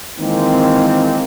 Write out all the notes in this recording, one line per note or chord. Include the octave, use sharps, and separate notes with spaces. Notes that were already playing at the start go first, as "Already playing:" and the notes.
D#3 E3 G#3 A#3 C4